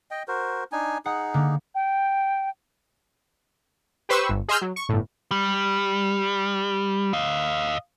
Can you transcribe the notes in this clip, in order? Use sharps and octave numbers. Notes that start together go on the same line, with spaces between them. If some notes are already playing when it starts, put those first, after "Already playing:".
D#5 G5
F#4 A#4 C5
D4 D#4 G#5
D#4 G#4 F#5
D3 A#3
G5
G4 B4 C5 C#6 E6
G1
G#4 D#5 C6 E6 F6 G6
F#3
C#6
G1 A2
G3
D#5 F5